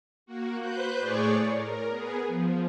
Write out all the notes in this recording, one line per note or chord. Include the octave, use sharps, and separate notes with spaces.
A#3 F#4
B4 C5 F#6 G6
A2 G#4 C#5 D5 C#6
A#4
B3 G#4
F3